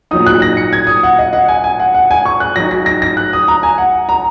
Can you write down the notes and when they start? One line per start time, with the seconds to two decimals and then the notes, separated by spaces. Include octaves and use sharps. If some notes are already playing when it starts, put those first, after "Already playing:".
0.11 A#2 F#3 D#4 D#6
0.26 F#6
0.42 A#6
0.57 C#7
0.73 G#6
0.87 D#6
1.03 F#5
1.19 D#5
1.33 F#5
1.48 G#5
1.64 G#5
1.80 F#5
1.94 F#5
2.11 G#5
2.25 C#6
2.40 F#6
2.56 F#3 D#4 A#6
2.71 A#6
2.86 A#6
3.02 A#6
3.17 F#6
3.33 D#6
3.48 A#5
3.63 G#5
3.78 F#5
4.09 A#5